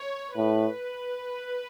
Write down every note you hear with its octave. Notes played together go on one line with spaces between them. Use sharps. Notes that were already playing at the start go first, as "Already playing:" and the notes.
Already playing: C#5
A2 B4